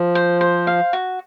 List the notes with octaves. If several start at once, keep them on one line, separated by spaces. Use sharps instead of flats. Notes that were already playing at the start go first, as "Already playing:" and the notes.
Already playing: F3
C5
C5
F5
F#4